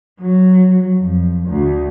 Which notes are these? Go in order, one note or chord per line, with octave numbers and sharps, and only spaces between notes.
F#3
F2
D2